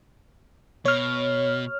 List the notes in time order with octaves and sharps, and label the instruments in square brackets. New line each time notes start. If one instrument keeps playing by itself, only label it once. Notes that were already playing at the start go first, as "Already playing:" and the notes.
[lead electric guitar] B2 [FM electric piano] C#5 F6